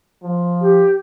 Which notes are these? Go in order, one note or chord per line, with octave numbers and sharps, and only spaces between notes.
F3
G4